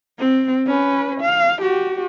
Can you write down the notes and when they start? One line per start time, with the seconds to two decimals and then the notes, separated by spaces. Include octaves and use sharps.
0.19 C4
0.67 C#4 B4
1.21 F5
1.62 F#4 G4